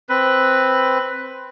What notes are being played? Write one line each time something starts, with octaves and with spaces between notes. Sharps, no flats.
C4 B4